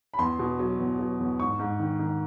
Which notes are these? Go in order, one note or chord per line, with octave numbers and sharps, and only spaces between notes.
B5
E2 C6
B2
F#3
E2
F#3
E2
G#2 C#6
G#2
D#3
D#3